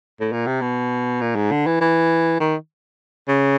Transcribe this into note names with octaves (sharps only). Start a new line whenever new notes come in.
A2
A#2
C3
B2
A#2
G#2
D3
E3
E3
D#3
C#3